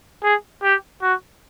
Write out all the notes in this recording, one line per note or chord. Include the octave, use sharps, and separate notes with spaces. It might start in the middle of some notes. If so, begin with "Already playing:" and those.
G#4
G4
F#4